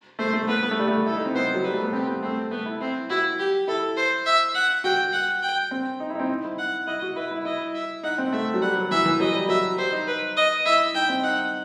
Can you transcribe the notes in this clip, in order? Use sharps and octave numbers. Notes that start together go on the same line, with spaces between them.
A3 C5
A3
B3 B4
B3
A3
G3
A3
E4 A4
D#4
C4
B3 C5
F#3
G3 B4
A3
B3
C4 G4
B3
A3 C4
A3 B3
E4
C4 E4
E4 F#4
G4
E4 A4
C5
E5
F#5
F#4 G5
F#5
G5
C4
D#4
E4
D#4
C4
D#4
E4
F#5
E4 D#5
F#4
E4 B4
E4
E4 D#5
E5
D#4 F#5
C4
A3 E5
F#3
G3 F#5
F#3
E3 E5
E3
F#3 D#5
G3
F#3 E5
G3 C5
D#4
B4
D#5
E4 E5
D#4 G5
C4
D#4 F#5